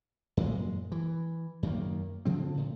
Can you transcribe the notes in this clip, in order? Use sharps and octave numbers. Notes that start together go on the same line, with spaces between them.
F#2 A#2 G#3
E3
F#2 D#3 A#3
D2 C#3 F3 C4
A2